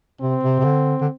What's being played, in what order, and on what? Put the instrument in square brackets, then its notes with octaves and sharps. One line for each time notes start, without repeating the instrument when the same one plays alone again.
[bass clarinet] C3 [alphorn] C4
[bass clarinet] C3
C3
D3
D3